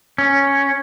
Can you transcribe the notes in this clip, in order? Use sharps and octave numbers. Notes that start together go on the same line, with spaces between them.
C#4